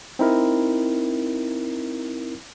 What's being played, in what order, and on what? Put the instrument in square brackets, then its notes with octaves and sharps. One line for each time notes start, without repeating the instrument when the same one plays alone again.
[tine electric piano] C4 D#4 E4 A#4